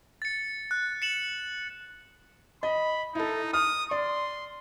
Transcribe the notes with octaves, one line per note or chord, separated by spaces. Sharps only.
A6 C#7
F#6
C#7 E7 F#7
D#5 B5
D#4 E4 A4
D#6 F6
D5 C6